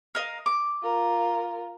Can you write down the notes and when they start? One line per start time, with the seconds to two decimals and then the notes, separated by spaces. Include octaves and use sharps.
0.15 A#4 D#5 F5
0.46 D6
0.83 F4 A#4